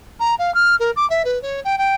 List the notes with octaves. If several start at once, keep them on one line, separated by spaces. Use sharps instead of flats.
A#5
F5
F6
A#4
D6
E5
B4
C#5
G5
G5